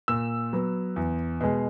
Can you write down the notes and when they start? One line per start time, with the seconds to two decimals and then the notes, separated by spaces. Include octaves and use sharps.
0.08 A#2 E6
0.53 F#3 B3
0.96 E2
1.41 B2 G#3